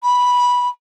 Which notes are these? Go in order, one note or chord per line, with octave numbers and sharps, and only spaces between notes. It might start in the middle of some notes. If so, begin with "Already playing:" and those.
B5